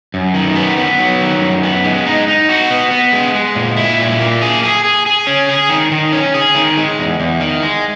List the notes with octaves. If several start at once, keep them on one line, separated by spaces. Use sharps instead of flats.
F#2
D#3
B3
B3
F#3
D#3
F#2
B3
G#3
D#4
D#4
F#4
B3
B3
G#3
G#3
A#2
E4
A#2
A#3
G#4
G#4
G#4
G#4
C#4
G#4
D#3
D#3
C#4
G#4
D#3
G#3
E2
E2
D#3
G#3